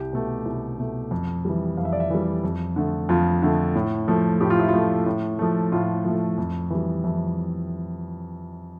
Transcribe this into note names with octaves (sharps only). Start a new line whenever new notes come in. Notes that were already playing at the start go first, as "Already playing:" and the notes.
Already playing: C2 G4
B2 A3
C2
B2 A3
F2
E3 G3
F2 F5
E5
D5
E5
E3 G3
F2
D3 A3
F2 F4
D3 A3
A2
F3 A3
A2 G4
F4
E4
F4
F3 A3
A2
F3 A3
A2 F4
F3 A3
F2
E3 G3
F2 E4